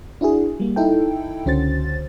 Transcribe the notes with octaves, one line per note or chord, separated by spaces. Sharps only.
D4 E4 F#4 G#4
G3 A#3
D#4 E4 A4 G5
C#2 D3 C#4 F#4 C5 A6